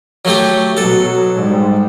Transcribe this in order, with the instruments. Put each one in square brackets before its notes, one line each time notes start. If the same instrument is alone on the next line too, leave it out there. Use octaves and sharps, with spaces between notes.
[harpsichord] F#3 A3 G4
[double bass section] B2 F#3 [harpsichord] A4
[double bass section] G#2 G3